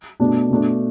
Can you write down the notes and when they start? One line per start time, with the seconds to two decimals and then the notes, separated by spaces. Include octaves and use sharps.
0.20 B2 A3 D4
0.50 B2 A3 D4